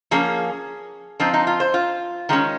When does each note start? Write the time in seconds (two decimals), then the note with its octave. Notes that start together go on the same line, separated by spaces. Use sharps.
0.11 F3 A#3 C#4 G#4
1.20 F3 C4 D#4 F4
1.34 D#4
1.47 F4
1.60 C5
1.74 F4
2.29 D#3 G#3 C#4